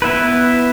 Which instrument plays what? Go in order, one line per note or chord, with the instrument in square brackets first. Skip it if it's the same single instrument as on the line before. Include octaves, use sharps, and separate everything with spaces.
[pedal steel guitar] B3 E4 B4